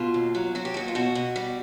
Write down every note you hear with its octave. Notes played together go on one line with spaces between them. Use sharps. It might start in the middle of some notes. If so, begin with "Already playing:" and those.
Already playing: B2 F4
D#2
F#3
F#3 F#4
G4
D#2 F#4
F4
B2 F#4
B2
G3